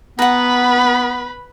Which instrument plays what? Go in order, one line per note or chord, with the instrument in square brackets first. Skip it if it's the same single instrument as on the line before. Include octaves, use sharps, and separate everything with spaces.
[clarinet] B3 [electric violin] B4 B5 [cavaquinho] F#5 A#5